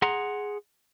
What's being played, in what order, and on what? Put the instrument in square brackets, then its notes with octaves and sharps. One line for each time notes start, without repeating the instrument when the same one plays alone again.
[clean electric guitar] G#4 F#5 A#5 C6